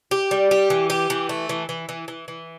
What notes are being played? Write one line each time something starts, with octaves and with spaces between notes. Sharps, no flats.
G4
G3
G4
E3
G4
E3
A3
E3
E3
E3
E3
E3